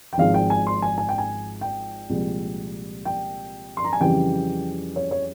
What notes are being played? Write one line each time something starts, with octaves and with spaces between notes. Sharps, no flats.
G5
G#1 G#2 F3 G#3 F5
G5
G#5
C6
G#5
G#5
G5
G#5
G5
C2 A#2 F3 G#3
G5
C6
A#5
G#5
F2 C#3 E3 G3 G5
C#5
C#5